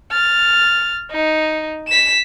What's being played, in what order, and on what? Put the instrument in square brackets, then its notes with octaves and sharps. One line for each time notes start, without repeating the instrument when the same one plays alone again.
[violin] F6 A6
D#4
B6 E7